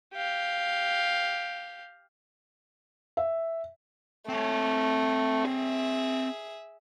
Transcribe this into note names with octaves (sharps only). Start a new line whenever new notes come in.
G4 F5
E5
A3 C4 C#5
G#4 E5